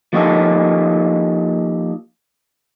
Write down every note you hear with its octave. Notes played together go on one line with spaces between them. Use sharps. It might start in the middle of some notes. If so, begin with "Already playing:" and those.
F3 A#3 D#4 G4 A4